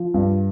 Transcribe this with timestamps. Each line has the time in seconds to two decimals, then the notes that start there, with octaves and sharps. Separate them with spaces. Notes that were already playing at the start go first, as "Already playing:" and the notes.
Already playing: F3
0.14 G2